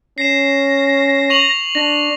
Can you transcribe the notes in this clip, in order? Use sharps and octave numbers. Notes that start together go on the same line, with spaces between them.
C#4 A#6 C7 E7
C#6 F7 F#7
D4 A#6